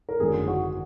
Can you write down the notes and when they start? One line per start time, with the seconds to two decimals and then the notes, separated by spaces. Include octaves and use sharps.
0.09 A#4
0.20 G#1 F#2 D3 F#3 G#4
0.48 F#4